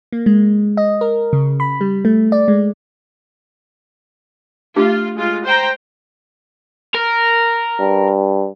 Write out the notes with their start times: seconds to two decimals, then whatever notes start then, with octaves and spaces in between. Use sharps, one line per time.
0.12 A#3
0.26 G#3
0.77 D#5
1.01 A#4
1.33 C#3
1.60 B5
1.81 G3
2.05 A3
2.32 D5
2.48 G#3
4.76 A3 D4 F4 G4
5.16 G#3 F4
5.45 C5 G5 A#5
6.94 A#4
7.79 G2